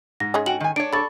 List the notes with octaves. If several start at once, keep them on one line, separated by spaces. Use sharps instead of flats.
G#2 A#6
G#3 C#4 G#4
F#4 G5 F#7
D#3 G#5
D4 C#5 D7
A4 D5 B5 C#6 A6